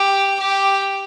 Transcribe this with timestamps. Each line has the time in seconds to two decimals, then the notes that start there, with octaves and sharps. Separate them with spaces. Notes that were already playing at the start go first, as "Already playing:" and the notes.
Already playing: G4
0.40 G4